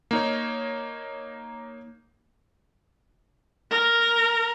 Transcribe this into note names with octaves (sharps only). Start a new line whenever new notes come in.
A#3 D#4 C#5
A#4